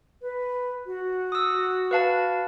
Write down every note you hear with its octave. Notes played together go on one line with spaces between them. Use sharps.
B4
F#4
D#6 E6
B4 F5 A5